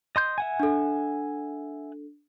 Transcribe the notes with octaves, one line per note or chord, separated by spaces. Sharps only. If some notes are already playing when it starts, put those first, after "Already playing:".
D#5 C6 G6
E5 F#5 G#5
D4 A4